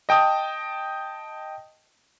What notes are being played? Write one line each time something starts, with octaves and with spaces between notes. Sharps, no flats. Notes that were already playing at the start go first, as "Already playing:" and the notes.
D#5 G5 A5 D#6